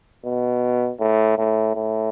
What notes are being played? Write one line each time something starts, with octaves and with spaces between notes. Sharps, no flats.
B2
A2
A2
A2